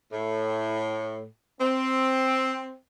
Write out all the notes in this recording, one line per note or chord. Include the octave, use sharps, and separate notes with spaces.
A2
C4